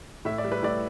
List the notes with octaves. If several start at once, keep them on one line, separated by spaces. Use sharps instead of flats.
A2 E5
D5
G3
B4
A2 D5